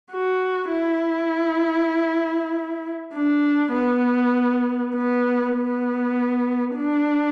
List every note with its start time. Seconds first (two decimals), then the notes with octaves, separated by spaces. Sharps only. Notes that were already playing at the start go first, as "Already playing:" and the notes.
0.11 F#4
0.72 E4
3.14 D4
3.74 B3
4.95 B3
5.56 B3
6.77 D4